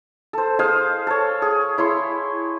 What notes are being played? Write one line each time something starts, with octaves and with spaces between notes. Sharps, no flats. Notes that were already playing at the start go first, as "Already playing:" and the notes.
A4 C5
G#4 C5 F5 D#6
A4 C#5
G#4
E4 C#5 C6